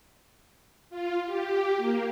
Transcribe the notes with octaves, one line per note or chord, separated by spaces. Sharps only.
F4
G4
A#3